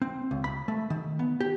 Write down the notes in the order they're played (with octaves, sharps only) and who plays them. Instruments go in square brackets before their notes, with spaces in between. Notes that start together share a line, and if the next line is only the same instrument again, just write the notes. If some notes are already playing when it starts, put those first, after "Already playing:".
[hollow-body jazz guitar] C4
C#2
B5
A3
D#3
B3
G4